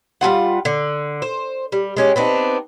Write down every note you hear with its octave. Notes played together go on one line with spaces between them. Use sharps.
G3 D#4 F4 F#5
D3
C5
G3
G#3 C#4 G4
B3 C4 D4 D#4